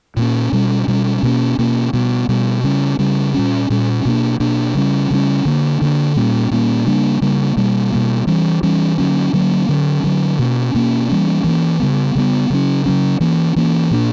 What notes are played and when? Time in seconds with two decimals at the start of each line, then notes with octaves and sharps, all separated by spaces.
0.17 A#2 A#3 C#4
0.52 B2 G3 C#4
0.88 B2 G3 C#4
1.23 B2 A#3 C#4
1.58 B2 A#3 C#4
1.93 B2 G3 B3
2.29 B2 G3 B3
2.64 C#3 G3 C#4
2.99 C#3 G3 C#4
3.34 A#2 G3 C#4
3.70 A#2 G3 C#4
4.05 B2 A#3 D4
4.40 B2 A#3 D4
4.75 C#3 G3 C#4
5.11 C#3 G3 C#4
5.45 D3 A#3 D4
5.81 D3 A#3 D4
6.16 A#2 G3 A#3 C#4
6.51 A#2 G3 A#3 C#4
6.87 C#3 G3 A#3 D4
7.21 C#3 G3 A#3 D4
7.57 B2 G3 A#3
7.92 B2 G3 A#3
8.27 E3 G3 C#4
8.63 E3 G3 C#4
8.98 D3 F#3 A#3 C#4
9.33 D3 F#3 A#3 C#4
9.69 D3 F#3 C#4
10.04 D3 F#3 C#4
10.39 B2 A#3 C#4
10.74 B2 A#3 C#4
11.09 E3 G3 A#3 C#4
11.44 E3 G3 A#3 C#4
11.80 C#3 G3 B3
12.15 C#3 G3 B3
12.50 C#3 F#3 C#4
12.86 C#3 F#3 C#4
13.20 E3 A#3 C#4
13.56 E3 A#3 C#4
13.91 A#2 A#3 D4